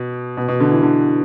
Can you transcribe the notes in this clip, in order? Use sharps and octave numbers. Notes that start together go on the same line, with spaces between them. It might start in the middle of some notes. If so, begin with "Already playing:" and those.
Already playing: B2
B2
B2
D3
E3
D3